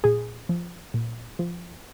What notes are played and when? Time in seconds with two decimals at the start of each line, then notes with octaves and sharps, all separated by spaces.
0.04 A#2 G#4
0.49 F3
0.94 A#2
1.39 F3